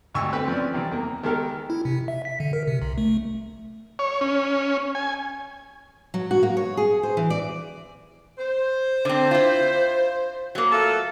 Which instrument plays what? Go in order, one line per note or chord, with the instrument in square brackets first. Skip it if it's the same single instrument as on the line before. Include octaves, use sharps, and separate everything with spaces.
[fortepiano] G#1 D2 G3 G#5 C#6 E6
A3 C4 B4
F3 C4 C#4 D5
D#3 E3 G3 C4
E2 A#3
D#3 G#3 B3 G4 A4 A#4
[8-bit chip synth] E4
C3
E5
B6
D3
A#4
C3
B1
A3
[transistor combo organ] C#5
C#4
G#5
[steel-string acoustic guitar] F#3
F#4
A#3
C#5
G#4
C5
E3
D5
[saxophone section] C5
[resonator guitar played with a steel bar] D3 C4
E4 F4
F#3 A#3
[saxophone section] A3 F4 A4